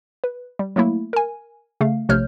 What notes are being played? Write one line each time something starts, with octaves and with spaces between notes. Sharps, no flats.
B4
G3
F#3 A3 A#3 E4
A#4 G#5
C#3 A3 F5
A#1 C3 A3 C#5 F6 G6